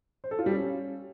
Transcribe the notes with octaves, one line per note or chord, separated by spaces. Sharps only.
C5
A4
F4
G3
C#4